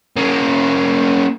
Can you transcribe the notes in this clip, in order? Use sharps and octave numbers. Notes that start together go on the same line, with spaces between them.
A#3 C#4